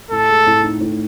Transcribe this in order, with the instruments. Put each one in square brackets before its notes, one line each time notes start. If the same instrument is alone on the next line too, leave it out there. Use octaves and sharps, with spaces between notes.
[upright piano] A2 [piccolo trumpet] A4
[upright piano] G#3
A2
D#4
A2